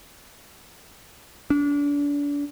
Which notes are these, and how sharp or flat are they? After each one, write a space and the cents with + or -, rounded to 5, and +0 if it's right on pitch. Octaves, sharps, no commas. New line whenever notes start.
D4 -35